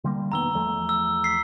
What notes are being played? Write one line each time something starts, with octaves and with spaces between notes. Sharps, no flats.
D3 G3 A#3
F1 D#3 B3 A#5 E6 G7
E2 F3 A3
E6
B6 C7